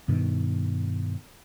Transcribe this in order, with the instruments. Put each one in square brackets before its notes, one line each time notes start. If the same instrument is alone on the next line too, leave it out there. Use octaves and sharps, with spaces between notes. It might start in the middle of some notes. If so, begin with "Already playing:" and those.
[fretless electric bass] G2 B2 D#3